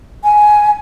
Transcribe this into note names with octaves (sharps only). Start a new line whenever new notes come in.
G#5